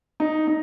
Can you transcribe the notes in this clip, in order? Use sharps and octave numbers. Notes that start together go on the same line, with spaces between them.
D#4
D#4